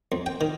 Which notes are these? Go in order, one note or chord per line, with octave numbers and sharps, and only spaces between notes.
F2
G5
D#3